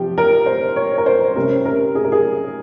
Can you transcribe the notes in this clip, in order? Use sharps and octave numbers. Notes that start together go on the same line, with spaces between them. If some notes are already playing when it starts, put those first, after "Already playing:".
Already playing: C3 F3 C4 G4
A#4
C5
C#5
A#4
C5
C3 G3 C#4 A#4
A#4
G#4
A#4
G#4